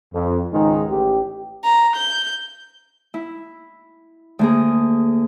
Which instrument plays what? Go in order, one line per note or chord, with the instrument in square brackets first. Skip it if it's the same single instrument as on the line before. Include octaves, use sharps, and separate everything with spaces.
[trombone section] F2
C#2 G#2 D#3 G#3 D#4
A1 G4
[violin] A#5
G6
[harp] E4
D2 A#3 G#4